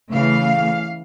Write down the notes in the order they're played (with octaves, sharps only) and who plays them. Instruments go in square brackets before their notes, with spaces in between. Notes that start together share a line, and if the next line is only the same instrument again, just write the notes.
[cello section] C#3 E3 A3 F5